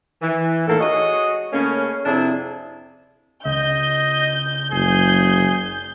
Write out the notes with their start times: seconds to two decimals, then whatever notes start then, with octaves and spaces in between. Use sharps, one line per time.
0.22 E3
0.67 A2 D#3 A#3 A4
0.80 G#3 F#4 C#5 D#5
1.53 C#3 A3 A#3 C#4
2.06 F2 C3 F3 D4 E4 G#4
3.45 C#2 D#5 G6
4.72 F#1 G#4